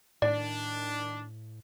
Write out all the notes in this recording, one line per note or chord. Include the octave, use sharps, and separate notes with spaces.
A2 D#3 D4 D5